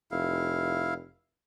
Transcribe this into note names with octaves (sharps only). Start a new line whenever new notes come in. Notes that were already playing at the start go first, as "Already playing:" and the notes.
F1 E4 F5